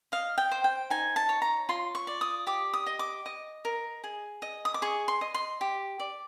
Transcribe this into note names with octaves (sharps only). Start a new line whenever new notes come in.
D#5 F5
G5
C5
G5
D#4 G#5
A5
C#5
A#5
F4 C6
C#6
D5
D#6
G4 D6
D#6
D#5
D6
D#5
A#4
G#4
D#5
D#6
D6
G#4 C#6
C6
D#5
C6
G4
D5